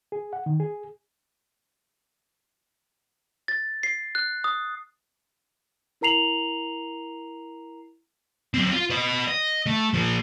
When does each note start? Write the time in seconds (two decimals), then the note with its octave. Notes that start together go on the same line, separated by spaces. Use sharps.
0.12 G#4
0.33 F#5
0.46 D#3
0.60 G#4
3.48 A6
3.83 C7
4.15 F#6
4.44 D#6
6.01 E4 A#4 A#5 C7 F7 F#7
8.54 F#3 C4
8.71 F4
8.90 B4 D#5
9.27 D#5
9.66 A3
9.94 F3 A#3